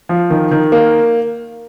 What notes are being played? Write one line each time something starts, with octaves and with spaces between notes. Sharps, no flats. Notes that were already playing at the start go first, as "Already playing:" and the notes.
F3
D#3
D#3
A#3